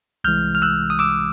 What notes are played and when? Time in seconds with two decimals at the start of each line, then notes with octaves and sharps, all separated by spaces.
0.24 C2 C3 E3 G#3 F6 G6
0.55 F6
0.62 E6 F#6
0.90 D#6
0.99 D6 E6